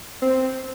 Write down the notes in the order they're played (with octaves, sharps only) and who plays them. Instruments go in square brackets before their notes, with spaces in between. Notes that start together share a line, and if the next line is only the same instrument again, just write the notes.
[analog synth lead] C4